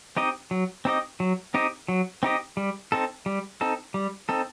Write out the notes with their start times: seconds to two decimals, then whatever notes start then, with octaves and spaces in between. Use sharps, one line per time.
0.17 C4 D#4 G4 D#5
0.51 F#3
0.85 C4 D#4 G4 D#5
1.20 F#3
1.54 C4 D#4 G4 D#5
1.88 F#3
2.23 C4 D#4 G4 D#5
2.57 G3
2.92 C4 D#4 A4
3.26 G3
3.61 C4 D#4 A4
3.94 G3
4.29 C4 D#4 A4